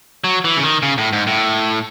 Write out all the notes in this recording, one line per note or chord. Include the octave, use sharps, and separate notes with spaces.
F#3
E3
C#3
D#3
C#3
A2
G#2
A2